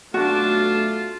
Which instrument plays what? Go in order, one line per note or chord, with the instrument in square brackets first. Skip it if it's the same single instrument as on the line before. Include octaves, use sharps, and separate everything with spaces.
[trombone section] B1 A3 [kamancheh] D4 A5 [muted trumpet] F4 [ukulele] F#4